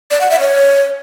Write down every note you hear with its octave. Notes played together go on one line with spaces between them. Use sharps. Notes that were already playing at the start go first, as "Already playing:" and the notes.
D5
F#5
E5
C#5